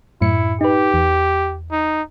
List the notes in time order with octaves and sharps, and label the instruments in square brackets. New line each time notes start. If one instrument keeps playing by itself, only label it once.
[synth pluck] F#2 A2 C#7 [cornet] E4
[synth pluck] D#4 B4 [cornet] G4
[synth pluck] E2
[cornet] D#4